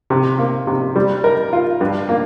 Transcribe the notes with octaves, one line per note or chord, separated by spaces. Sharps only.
C3
A#3
C3
G3
A#4
F4
G2
A#3